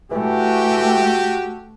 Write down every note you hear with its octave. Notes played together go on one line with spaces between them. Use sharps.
E3 A3 F#4 G4